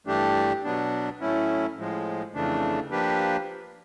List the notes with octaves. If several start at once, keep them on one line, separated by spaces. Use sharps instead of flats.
G2 E3 A3 D4 G4
B2 F#3 B3 D4
A2 F#3 A3 C#4 E4
A2 F3 G#3
F2 C#3 E3 A3 D4
F3 A#3 D4 G4 B4